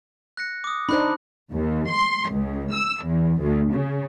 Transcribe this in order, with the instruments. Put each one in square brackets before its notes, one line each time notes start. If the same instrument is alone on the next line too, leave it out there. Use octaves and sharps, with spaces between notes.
[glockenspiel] F#6 A#6 C#7
D6 D#6
[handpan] D4 D#4 C5 [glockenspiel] B5 F#6
[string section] D#2
C6
C#2
E6
E2
D2
C#3